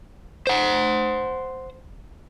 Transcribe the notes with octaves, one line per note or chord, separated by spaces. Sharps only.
C5 F#5